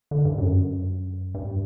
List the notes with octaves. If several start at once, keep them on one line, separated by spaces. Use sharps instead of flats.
D3
G2
F#2
G2